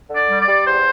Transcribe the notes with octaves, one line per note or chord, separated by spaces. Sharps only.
D3
D5
G3
D5
G3
E2 C5